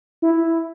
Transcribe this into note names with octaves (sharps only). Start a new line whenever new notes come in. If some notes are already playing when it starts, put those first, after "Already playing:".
E4